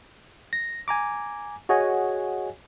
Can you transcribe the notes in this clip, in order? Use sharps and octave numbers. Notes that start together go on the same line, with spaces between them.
A#6
G#5 A#5 D6
F#4 G#4 C#5 D#5 F#5 G#5